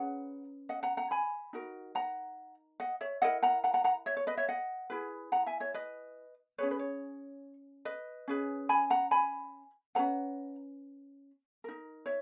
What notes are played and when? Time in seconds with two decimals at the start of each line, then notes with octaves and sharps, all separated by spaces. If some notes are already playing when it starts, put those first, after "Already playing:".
Already playing: C#4 G#4 B4 F#5 A#5
0.69 D#5 F#5
0.83 F#5 A#5
0.97 F#5 A#5
1.11 G#5 B5
1.53 D#4 F#4 A#4
1.95 F#5 A#5
2.80 D#5 F#5
3.01 C#5 E5
3.22 E4 A#4 D#5 F#5
3.43 F#5 A#5
3.64 F#5 A#5
3.74 F#5 A#5
3.84 F#5 A#5
4.06 C#5 E5
4.17 C#5
4.27 B4 D#5
4.37 C#5 E5
4.49 D#5 F#5
4.90 E4 G#4 B4
5.32 F#5 A#5
5.46 E5 G#5
5.60 C#5 E5
5.74 B4 D#5
6.58 C#4 G#4 B4 C#5
6.71 B4
6.79 C#5
7.85 B4 D#5
8.28 C#4 G#4 B4
8.69 G#5 B5
8.90 F#5 A#5
9.11 G#5 B5
9.95 C#4 G#4 B4 F#5 A#5
11.64 D#4 A#4
12.06 C#5 E5